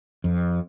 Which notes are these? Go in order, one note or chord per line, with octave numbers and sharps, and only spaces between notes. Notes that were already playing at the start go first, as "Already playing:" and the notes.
F2